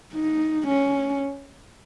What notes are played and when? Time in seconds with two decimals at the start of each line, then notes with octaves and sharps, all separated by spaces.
0.14 D#4
0.67 C#4